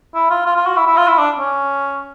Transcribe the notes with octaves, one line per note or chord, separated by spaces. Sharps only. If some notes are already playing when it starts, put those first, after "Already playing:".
E4
F4
F4
F4
F#4
E4
E4
F4
E4
D4
C#4